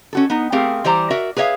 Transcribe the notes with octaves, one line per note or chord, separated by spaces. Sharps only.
C#4 F#4 A4
B3 D#4
A3 C4 G4 G#4 A#4 F5
E3 G3 G4 C5 D5 A#5
F#4 A#4 D5 E5
G#4 B4 C#5 E5 F5